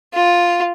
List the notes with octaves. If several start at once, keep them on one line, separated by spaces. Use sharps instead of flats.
F4